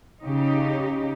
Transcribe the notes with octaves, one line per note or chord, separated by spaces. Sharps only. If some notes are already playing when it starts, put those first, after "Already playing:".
C#3 D#4 G4